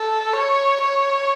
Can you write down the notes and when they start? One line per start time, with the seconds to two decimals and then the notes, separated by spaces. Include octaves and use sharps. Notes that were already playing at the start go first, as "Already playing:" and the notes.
Already playing: A4
0.33 C#5
0.81 C#5